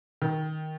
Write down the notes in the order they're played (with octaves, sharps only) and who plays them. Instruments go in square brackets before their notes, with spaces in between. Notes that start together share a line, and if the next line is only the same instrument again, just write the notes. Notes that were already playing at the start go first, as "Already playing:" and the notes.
[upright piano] D#3